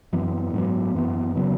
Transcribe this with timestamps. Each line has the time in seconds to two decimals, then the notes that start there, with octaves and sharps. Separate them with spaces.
0.13 F#2 E3 B3
0.54 G#2 F#3 B3
0.95 F#2 E3 B3
1.35 C#3 F#3 B3